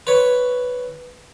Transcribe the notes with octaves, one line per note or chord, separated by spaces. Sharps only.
B4 C#5